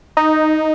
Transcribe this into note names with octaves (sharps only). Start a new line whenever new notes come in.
D#4